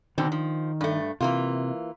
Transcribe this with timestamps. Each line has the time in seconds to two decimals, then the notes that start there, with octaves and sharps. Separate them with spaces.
0.18 B2 D3 D#3 C4
0.32 F3
0.81 G2 A3
1.21 C3 E3 A#3 F4